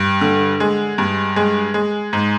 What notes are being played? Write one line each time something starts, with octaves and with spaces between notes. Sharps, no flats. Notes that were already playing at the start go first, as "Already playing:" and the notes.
Already playing: G2
D3
G#3
G2
G#3
G#3
G#2